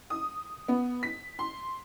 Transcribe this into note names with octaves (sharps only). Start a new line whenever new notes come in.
D#6
B3
B6
C6